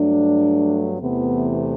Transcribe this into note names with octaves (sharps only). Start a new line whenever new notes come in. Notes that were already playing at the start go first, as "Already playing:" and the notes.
Already playing: G2 F#3 A3 D4
E2 C3 E3 A3 B3